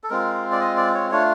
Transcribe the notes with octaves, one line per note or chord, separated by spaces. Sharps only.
A4
G#3 C4 F4 A#4
D5
D#5
D5
C#5
A3 D4 F4 C#5